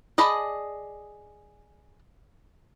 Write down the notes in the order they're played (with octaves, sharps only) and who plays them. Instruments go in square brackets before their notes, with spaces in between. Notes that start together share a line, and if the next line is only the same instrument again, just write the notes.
[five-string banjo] G#4 D5 D#5 A5 B5